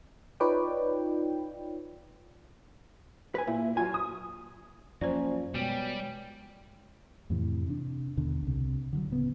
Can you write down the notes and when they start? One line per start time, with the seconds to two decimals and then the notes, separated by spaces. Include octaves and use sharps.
0.40 D#4 F4 B4 C#5 D5 G5
3.35 B4 G#5
3.47 A#2 E4
3.77 F#3 F4 G#5
3.94 D#6
5.01 F#2 F3 A#3 C#4 C5 D5 G#5
5.54 B2 G3 G#3 C#5 G5
7.30 F2 A2 C3 E3
7.67 C3 D4
8.17 D#2 B2 D3
8.43 C2 C3
8.93 D3 D#3 F#3
9.10 D1 C#3 B3